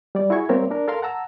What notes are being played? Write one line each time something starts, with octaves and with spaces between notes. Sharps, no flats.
G3 D5
E4 F#4 G#4 C#6 G#6
G3 A#3 C4 A#4 C#5 E5
D4 A#4
A4 A#4 F5 C6
F#5 A5 A#5 E6